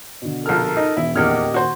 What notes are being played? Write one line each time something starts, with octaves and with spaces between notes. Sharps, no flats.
B2 D3
A#1 A4 A#4 F6
D#4
E1 E4
D#1 E2 D#3 A#3 G4 D#5 F6 G#6
F#4 C5